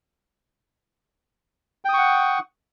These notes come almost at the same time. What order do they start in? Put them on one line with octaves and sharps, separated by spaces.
G5 D#6 C#6 F#5